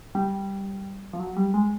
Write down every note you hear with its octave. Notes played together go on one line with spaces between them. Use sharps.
G3
F3
F#3
G3
G#3